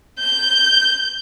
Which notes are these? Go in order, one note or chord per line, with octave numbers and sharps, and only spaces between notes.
G6